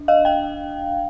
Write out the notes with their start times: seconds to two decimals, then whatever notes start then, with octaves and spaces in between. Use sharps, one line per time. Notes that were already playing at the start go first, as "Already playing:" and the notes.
Already playing: D4
0.08 D#5 F5
0.25 F5 G5